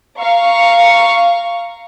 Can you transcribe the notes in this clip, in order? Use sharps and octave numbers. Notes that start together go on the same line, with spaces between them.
F5 A#5 C#6